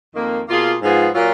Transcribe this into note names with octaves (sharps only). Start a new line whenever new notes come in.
F2 D#3 A#3
B2 A#3 F4 G#4
G#2 F3 B3 F4 G#4
A#2 F#3 A#3 F4